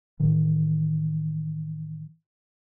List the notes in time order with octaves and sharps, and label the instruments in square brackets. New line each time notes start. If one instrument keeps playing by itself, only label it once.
[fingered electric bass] A2 D#3 E3